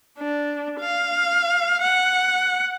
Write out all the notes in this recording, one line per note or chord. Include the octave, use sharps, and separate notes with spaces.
D4
F5
F#5